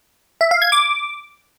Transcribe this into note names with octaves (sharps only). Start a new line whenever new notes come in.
E5
F5
G#6
D6